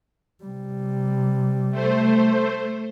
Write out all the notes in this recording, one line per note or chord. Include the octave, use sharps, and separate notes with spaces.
C3 G3
A3 C5